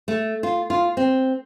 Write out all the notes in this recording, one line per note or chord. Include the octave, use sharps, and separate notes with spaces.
A3
F4
F4
C4